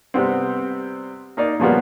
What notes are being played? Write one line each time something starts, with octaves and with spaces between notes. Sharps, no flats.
C3 G3 B3 C4
A#3 D#4 D5
A#2 C#3 F3 G3 A#3 B3